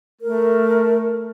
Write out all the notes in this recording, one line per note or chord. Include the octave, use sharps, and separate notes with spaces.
A3 A#4